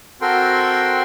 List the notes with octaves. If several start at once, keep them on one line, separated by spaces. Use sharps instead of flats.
C4 F#4 A4 A#4 G5 C6